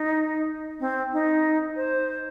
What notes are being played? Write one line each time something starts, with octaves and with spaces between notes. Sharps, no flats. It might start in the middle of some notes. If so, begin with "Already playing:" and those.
Already playing: D#4
C4
D#4
C5